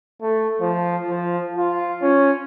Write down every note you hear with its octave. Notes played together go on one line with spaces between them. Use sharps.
A3
F3
F3
F4
C#4